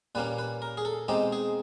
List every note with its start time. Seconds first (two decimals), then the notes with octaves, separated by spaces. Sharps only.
0.15 A#2 G3 A#3 C#4 B4
0.39 B4
0.62 A#4
0.77 G#4
0.85 A4
1.08 B2 G#3 C4 D#4 G4
1.32 G#4